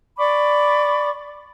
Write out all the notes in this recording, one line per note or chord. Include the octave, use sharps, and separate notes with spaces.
D5 B5 C#6 D6